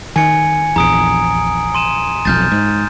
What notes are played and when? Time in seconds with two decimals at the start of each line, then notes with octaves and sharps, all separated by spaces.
0.16 D#3 G#5 G#6 C#7
0.76 A#1 E2 A#5 D#6 D7
1.75 C6 D#7 E7
2.25 F1 B1 F2 F6 G6 A6
2.52 G#2